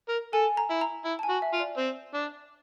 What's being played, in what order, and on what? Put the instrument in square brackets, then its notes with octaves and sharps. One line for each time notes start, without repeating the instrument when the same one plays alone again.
[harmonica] A#4
[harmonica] A4 [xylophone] G#5
[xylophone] A#5
[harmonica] E4
[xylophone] A#5
[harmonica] E4
[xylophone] A5
G#5
[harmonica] F#4
[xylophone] E5
[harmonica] F4
[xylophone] D5
[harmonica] C4
D4